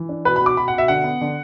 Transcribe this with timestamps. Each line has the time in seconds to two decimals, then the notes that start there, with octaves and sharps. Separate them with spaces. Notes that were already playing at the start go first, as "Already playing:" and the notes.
Already playing: E3
0.09 D4
0.25 B2 B4
0.36 B2 B5
0.46 D6
0.57 B2 B5
0.68 F#5
0.73 B2 E5
0.88 D3 F#5
1.04 B3
1.21 D3